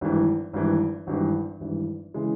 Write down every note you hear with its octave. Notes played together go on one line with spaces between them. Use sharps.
G#1 G2 E3
G#1 G2 E3
G#1 G2 E3
G#1 G2 E3
C#3 E3 G#3